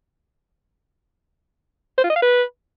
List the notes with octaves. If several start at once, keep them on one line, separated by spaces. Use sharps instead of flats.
C5
F4
D#5
F5
B4